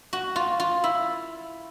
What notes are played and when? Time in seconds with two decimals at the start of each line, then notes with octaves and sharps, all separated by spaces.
0.13 F#4
0.36 F4
0.60 F4
0.84 E4